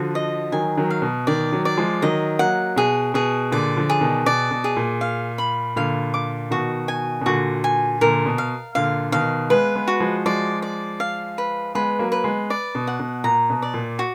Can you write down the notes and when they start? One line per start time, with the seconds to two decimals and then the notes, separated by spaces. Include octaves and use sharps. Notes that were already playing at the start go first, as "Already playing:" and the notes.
Already playing: D3 F3 F#4
0.15 D#5
0.52 D#3 F#3 G#5
0.77 D#3 F#3
0.90 F5
1.02 B2
1.27 B2 D#3 D5
1.52 D#3 F#3
1.65 D5
1.77 F3 G#3
2.02 D#3 F#3 D#5
2.39 F#3 A#3 F#5
2.76 B2 G#4
3.14 B2 G#4
3.52 A#2 D3 D5
3.76 D3 F3
3.90 G#4
4.01 B2 D#3
4.26 B2 D5
4.51 B2
4.64 G#4
4.77 A#2
5.01 F5
5.38 B5
5.76 A#2 D3 F5
6.14 D6
6.51 B2 D#3 F#4
6.88 G#5
7.21 B2
7.26 A#2 D3 F#4
7.64 G#5
8.01 A#2 D3 A#4
8.26 B2
8.38 F5
8.75 A#2 D3 F5
9.12 B2 D#3 F5
9.50 G#3 B3 B4
9.75 G#3 B3
9.88 F#4
10.00 F3 G#3
10.26 F3 G#3 D5
10.62 D5
11.00 F5
11.38 B4
11.75 G#3 B3 B4
11.99 F#3 A#3
12.12 B4
12.24 G#3 B3
12.50 D5
12.75 B2
12.87 F#5
13.00 B2
13.24 A#2 A#5
13.50 B2
13.62 D5
13.74 A#2
13.99 F#4